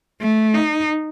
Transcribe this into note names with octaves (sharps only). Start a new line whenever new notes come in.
A3
D#4